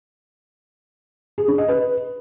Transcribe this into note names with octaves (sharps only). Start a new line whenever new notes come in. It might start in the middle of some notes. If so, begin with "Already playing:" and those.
G#4
D4
D#5
B4